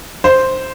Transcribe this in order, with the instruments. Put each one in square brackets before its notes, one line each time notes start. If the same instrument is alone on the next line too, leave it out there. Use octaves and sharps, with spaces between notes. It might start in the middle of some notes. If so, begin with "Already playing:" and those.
[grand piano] C5